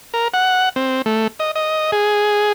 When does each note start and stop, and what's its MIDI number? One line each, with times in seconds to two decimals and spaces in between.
0.14 0.28 70
0.34 0.69 78
0.76 1.02 60
1.06 1.27 57
1.40 1.51 75
1.56 1.91 75
1.92 2.52 68